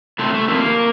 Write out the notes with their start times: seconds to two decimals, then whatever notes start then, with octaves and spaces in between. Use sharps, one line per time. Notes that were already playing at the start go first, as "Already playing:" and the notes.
0.19 A2 C3 A3 C4
0.34 A3
0.48 F2 C3 D#3 A#3